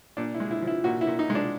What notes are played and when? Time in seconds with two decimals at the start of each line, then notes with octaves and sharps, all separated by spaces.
0.17 A#2 D4
0.34 E4
0.40 G#3
0.51 E4
0.62 F3
0.67 E4
0.84 A#2 F#4
1.01 E4
1.07 A#2
1.19 D#4
1.30 G#3
1.35 D4